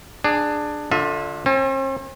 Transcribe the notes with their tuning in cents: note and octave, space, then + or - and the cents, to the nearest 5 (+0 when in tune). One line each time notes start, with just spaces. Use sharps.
D4 +15 G#4 +0
D3 +0 F4 +30 E5 -20
C4 +45 A5 -25